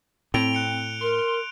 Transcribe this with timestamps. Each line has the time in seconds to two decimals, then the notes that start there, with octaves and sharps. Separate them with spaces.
0.34 A2 C4 D7 F7 G7
0.53 F#6 C#7 G7
1.01 A#4 C6